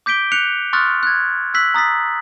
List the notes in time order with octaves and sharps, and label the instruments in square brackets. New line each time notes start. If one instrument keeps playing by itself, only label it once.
[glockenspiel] D6 G6 B6 D7 G7
F#6 C#7 F7
C6 C#6 D#6 F6 F#6 A6
F#6 G#6
E6 F#6 B6 F#7
A#5 D#6 A6 B6